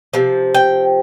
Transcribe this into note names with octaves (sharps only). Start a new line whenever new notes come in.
C3 F3
G5